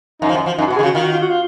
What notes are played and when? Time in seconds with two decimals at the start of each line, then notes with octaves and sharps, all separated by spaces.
0.22 F#2 D#4
0.29 F3
0.35 F#2
0.46 F3
0.58 F#2 D#4
0.67 F#4
0.70 B2
0.76 G#4
0.79 D#3
0.83 C#3
0.86 F#4
0.95 D#3 F4
1.03 F#4
1.13 F4
1.22 F#4
1.30 F4